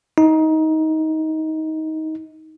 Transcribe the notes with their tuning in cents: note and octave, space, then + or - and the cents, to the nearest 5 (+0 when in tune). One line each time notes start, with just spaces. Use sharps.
D#4 +20